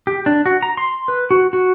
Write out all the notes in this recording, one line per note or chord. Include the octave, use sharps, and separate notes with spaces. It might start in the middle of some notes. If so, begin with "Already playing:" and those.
G4
D4
F#4
A#5
C6
B4
F#4
F#4